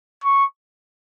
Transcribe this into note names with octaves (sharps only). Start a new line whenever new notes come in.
C#6